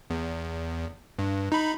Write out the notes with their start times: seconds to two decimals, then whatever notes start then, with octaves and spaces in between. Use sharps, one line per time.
0.10 E2
1.19 G2
1.52 D#4 B5